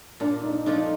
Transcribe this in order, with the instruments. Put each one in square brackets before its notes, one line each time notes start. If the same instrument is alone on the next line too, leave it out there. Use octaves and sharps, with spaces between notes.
[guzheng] A#2 [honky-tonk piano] D4
[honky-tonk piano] D#4
[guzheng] F3 A3 D4 F4 [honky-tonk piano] D#4